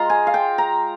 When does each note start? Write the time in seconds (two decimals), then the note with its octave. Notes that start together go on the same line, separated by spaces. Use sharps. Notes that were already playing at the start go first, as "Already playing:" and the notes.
Already playing: G#3 F4 A#5 C6
0.10 G#5
0.27 F5
0.34 G5
0.58 A#5